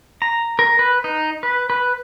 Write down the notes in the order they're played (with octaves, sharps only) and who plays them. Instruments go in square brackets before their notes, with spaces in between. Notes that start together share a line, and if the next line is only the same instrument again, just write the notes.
[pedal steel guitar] A#5
A#4
B4
D#4
B4
B4